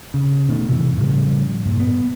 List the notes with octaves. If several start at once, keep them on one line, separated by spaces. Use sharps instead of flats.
C#3
B2 D#3 A3
F2 A2 C3 E3
A2 C#3 F3 G3
G2 A#2
B3